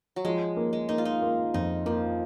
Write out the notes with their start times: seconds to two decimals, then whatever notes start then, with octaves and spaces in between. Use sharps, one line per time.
0.16 F#3
0.24 F3 G#3
0.57 A#3
0.73 G#3
0.89 A#3 D#4
0.98 F4
1.05 D#4
1.22 A#3
1.54 F2 D#4
1.86 F3 A#3